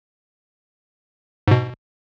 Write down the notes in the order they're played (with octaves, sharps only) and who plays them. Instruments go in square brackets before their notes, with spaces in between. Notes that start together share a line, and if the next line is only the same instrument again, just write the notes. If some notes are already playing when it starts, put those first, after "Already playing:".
[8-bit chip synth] G#2 B2